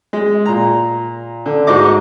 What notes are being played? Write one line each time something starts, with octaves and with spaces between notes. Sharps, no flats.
G#3
A#2 A#5
D3
G#2 D#4 F#4 D#5 D6